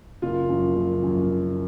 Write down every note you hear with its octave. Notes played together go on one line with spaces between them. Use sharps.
F#1 F4
F#2 F3
F#1
F#2 F3
F#1